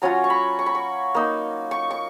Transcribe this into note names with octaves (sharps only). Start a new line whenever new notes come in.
F#3 C#4 F4 A#5
C#6
B5
C#6
B5
C#6
A#3 D#4
C#6
C#6